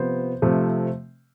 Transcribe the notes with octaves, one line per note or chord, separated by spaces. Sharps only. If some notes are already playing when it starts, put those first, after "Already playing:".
Already playing: C3 F3 B3 C5
C3 F3 A3 C4